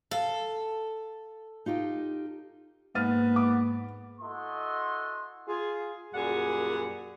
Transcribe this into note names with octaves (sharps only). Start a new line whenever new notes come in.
A4 F5
D#4 F4 G4
G#2 A#3 B3 F6 A6 D#7
D6
E4 F#4 A4 D#5 F#5 C6
F4 G#4
F#2 A#2 G3 G#4 F#5